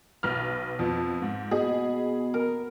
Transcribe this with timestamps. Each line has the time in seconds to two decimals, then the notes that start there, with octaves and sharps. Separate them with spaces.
0.23 B1 B4 F6
0.79 F2 B3
1.22 G#2
1.51 B2 G#4
2.34 A#4